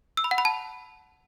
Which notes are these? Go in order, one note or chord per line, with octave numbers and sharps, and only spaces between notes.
E6
B5
F#5
B5
A5